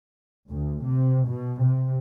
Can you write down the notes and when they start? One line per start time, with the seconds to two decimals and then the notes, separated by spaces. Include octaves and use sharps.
0.50 D2
0.87 C3
1.29 B2
1.64 C3